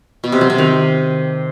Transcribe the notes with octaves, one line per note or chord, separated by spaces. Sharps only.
B2
C3
F#3
C3
D#3